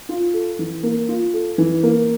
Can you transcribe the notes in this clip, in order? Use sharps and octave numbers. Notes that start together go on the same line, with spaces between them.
F4
A4
E3
A#3
F4
A4
E3
A#3